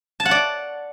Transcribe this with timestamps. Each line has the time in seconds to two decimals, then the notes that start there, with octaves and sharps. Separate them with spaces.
0.20 A5
0.26 F#5
0.31 D5